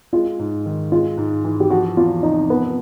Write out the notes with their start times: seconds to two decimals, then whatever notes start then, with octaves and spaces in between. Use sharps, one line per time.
0.13 G#3 F4
0.39 G#2
0.66 D#3
0.92 G#3 F4
1.18 G#2
1.44 E3
1.60 G4
1.70 F3 F#4
1.97 E2 F4
2.23 C3 D#4
2.50 F3 B3